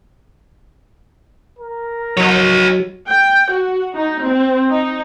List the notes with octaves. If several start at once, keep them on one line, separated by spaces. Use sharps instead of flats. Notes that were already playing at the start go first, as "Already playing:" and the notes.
A#4
F#3 D#4 C#5
G5
F#4
D#4
C4
D#4